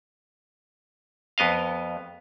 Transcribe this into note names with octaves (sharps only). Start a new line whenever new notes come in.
F2 B3 D#5 F5